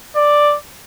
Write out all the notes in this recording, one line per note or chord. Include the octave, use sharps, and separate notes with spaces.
D5